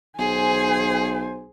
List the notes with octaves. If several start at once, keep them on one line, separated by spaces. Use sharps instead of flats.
B1 G#4 C5 G#5